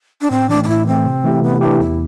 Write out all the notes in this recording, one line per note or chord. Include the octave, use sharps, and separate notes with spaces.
D4
A2 C4
E3 A3 D4
D4
A2 E4
E3 A3 C4
C3
E3 A3 E4 G4
C3 B3
E3 A3 D4 E4 G4
E2 E4